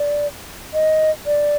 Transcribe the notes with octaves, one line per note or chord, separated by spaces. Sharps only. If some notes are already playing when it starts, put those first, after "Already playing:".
Already playing: D5
D#5
D5